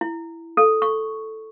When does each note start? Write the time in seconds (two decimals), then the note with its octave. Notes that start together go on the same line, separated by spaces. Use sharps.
0.01 E4
0.57 A4
0.82 C#6